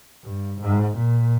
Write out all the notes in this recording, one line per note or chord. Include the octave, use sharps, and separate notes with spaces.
G2
G#2
A#2